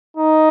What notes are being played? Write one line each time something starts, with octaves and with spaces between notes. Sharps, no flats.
D#4